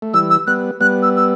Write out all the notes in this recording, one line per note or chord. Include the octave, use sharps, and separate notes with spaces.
A3
E3 G3 E6
E6
G3 B3 F#6
G3 B3 F#6
E6
E6